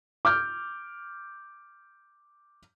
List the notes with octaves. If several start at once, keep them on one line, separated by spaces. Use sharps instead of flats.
D6 F6 G6